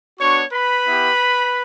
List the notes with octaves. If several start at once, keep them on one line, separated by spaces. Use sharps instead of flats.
B3 D4 F#4 C#5 C#6
B4 B5
B3 E4 G4